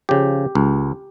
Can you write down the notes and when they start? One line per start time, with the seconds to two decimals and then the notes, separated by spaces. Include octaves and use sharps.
0.09 C#3 F3 G4
0.55 C#2